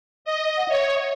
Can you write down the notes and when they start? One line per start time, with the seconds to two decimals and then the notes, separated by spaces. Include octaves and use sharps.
0.25 D#5
0.57 F#5
0.68 C#5 E5